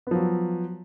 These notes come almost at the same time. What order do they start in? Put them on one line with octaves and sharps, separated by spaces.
B3 F3 F#3